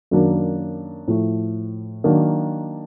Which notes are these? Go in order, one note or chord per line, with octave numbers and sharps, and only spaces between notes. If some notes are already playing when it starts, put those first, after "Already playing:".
F#2 D#3 F#3 A#3 D4
A2 F3 A3
D#3 F#3 A#3 D4